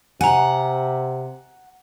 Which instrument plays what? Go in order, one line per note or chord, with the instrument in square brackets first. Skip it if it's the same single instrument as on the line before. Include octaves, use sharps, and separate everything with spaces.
[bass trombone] C3 [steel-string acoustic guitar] F#5 [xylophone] G#5 A#5